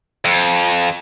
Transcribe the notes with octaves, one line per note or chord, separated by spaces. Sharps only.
F2